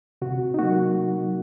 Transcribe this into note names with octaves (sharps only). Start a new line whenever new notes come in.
C3 F#4
D#4
F#3 A#3 F#4